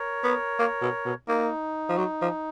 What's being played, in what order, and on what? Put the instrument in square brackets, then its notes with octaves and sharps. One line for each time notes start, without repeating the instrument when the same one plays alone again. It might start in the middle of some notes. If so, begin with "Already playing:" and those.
Already playing: [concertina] A#4 C#5
[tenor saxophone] B3
A#3
B2
B2
[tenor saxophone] A#3 [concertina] D#4
[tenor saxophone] F3
F#3
F3